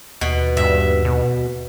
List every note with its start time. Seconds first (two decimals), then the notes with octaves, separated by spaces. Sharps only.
0.21 D#2 B2
0.57 G2 E5
1.05 B2